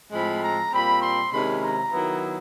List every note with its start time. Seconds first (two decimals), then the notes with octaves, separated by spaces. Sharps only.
0.12 A2 F3 G#3 C4 B5
0.42 A#5
0.73 A#2 G3 C4 B5
1.02 C6
1.32 C3 D#3 G#3 C#4 E4 B5
1.62 A#5
1.93 D#3 F#3 B3 E4